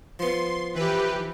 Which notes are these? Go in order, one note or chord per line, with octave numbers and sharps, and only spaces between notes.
F3 B3 C6
E3 G4 B4